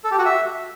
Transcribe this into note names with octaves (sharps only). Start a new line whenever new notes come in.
A4
G4
F#4
E5